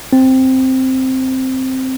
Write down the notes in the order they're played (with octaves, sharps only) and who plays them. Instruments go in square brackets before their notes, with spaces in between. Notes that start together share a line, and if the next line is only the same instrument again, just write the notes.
[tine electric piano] C4